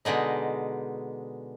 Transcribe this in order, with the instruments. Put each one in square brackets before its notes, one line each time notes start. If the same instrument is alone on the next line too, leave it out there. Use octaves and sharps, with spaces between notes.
[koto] B2 D3 G#3 D#4